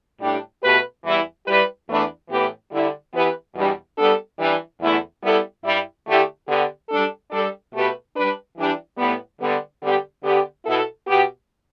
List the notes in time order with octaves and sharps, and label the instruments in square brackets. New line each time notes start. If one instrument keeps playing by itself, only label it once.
[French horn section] A2 G3 D4 G4
B2 A3 G4 B4
E2 E3 G3 E4
G3 E4 G4 B4
E2 E3 A3 D4 B4
A2 E3 B3 G4 B4
D3 G3 E4
E3 B3 G4 B4
E2 B2 G3 D4
G3 B3 D4 A4
E3 G3 D4
E2 D3 A3 E4 A4
G3 B3 E4 A4
G2 G3 E4
D3 A3 E4 G4
D3 B3 G4
G3 D4 A4
G3 D4 A4
B2 A3 G4 B4
G3 D4 B4
E3 G3 D4 G4
A2 G3 B3
D3 G3 B3
D3 G3 B3 G4
D3 B3 G4
B2 B3 E4 A4
B2 B3 G4